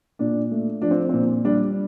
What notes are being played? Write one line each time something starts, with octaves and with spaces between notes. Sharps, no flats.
A#2 D4
A3
F3 D4
C4
A#2 C4
G3 D4